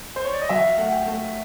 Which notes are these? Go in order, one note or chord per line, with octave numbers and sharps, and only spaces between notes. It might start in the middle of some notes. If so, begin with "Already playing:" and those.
C5
C#5
D5
D#5
F#3 E5
F5
A3 F#5
G5
A3